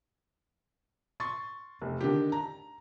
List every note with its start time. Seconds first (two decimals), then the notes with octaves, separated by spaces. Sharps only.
1.20 C6 C#6 A6
1.81 F1
2.01 D3 D#3 G4
2.32 A#5